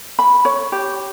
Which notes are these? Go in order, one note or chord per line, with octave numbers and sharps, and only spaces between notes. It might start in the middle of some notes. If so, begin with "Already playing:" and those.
B5
C#5
G4